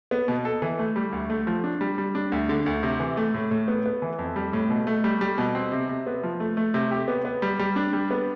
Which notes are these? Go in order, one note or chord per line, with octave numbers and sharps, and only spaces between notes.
B3
B2
A4
E3
A3
G3
D2
A3
F3
D4
G3
G3
D4
D2
D3
D2
C3
E3
A3
A2
A2
B3
B3
E3
F2
G3
A2
B2
A3
G3
G3
B2
C4
C3
C3
B3
F3
A3
A3
C3
G4
B3
B3
G3
G3
D4
G3
B3